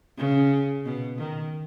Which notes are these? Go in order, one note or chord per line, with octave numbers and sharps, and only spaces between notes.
C#3
B2
D#3